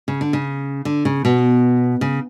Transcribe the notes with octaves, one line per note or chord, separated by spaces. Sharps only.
C#3
D3
C#3
D3
C#3
B2
C#3